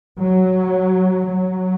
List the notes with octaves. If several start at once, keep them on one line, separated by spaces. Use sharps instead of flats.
F#3
F#3